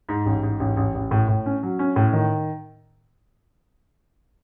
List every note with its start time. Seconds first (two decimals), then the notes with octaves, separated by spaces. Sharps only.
0.09 G#2
0.26 A1
0.43 G#2
0.60 A1
0.77 A1
0.95 A1
1.11 A2
1.28 A2
1.46 C#4
1.63 F#3
1.79 C#4
1.96 A2
2.13 D#3